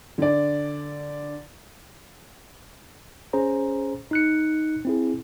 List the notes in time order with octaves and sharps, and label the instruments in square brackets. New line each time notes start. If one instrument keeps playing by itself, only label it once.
[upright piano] D3 D5
[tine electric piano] C#4 G#4 C5 A#5
D#4 F#6 C#7
C4 E4 G#4